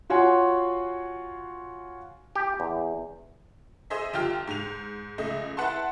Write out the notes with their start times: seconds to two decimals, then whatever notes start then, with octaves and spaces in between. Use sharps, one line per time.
0.10 F4 F#4 C#5 F#5 G#5 C6
2.36 G4
2.60 E2
3.90 G#4 C5 D#5 E5
4.13 G1 F4 G4 F6
4.47 G#2 F7
5.18 C#2 A3 D#5
5.57 E4 B4 F#5 A5 C6